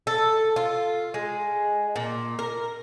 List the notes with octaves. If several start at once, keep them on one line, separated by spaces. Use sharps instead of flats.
A4
F4
G#3
A#2
A#4